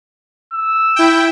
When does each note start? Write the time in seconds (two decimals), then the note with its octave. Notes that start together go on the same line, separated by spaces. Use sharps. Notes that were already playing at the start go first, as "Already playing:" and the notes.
0.54 E6
0.96 E4 G5